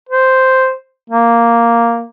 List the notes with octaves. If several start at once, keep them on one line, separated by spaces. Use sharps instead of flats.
C5
A#3